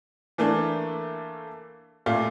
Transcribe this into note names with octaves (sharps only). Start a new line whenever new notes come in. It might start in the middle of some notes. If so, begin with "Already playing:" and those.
E3 A3 A#3 D4
A#2 A3 F4